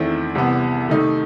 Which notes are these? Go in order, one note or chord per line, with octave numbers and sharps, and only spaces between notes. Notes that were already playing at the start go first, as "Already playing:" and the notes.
Already playing: E2 D#3 A3 C4 E4
C2 C3 E3 B3
C3 D#3 A3 D#4